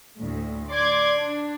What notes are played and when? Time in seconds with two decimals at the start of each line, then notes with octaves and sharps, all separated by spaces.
0.17 D2 A2
0.71 D5 C6 D6 G#6
1.17 D4